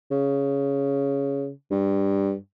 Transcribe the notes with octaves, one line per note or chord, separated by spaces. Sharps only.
C#3
G2